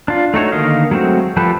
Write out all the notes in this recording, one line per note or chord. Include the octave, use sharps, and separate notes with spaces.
D4 F4
A3 D#4 F#4 C#5
D3 D#3 A#3 D#5 F5
F#3 G#3 A3 C4 F#4
F3 G3 G4 A4 B4